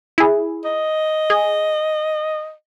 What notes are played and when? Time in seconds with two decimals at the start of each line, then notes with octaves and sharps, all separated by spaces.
0.18 E4 G#4
0.65 D#5
1.30 G#4